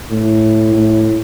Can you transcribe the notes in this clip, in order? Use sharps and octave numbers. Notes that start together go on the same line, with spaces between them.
A2
A2